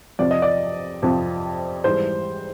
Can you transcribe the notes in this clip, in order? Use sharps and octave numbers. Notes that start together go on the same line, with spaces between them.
F2 C3 F3 D5
D#5
D5
F2 C3 F3
G#2 E3 G3 C5